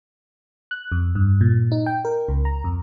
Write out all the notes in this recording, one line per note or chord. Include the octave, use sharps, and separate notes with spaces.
F#6
F2
G2
A#2
D#4
G5
A#4
C#2
A#5
F2